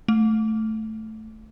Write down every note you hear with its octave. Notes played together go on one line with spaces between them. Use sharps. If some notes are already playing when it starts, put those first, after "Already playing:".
A3